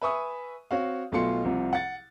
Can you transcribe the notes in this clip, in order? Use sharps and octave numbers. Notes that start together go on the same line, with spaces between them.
B4 E5 G#5 C#6 D#6
C4 F#4 C#5 F5
B1 B2 A3 F4 C6 C#7
C2 C3 F3
F#5 A6